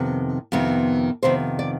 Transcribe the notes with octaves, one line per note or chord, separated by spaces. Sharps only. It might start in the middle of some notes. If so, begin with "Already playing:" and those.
Already playing: F2 C3 D#3 B3
F2 C3 D#3 B3
F2 C3 D#3 B3 C5
D5